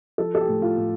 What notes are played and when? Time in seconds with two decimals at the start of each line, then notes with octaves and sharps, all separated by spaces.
0.18 F3 A4
0.35 A4
0.41 G4
0.48 A2
0.62 F4
0.77 A2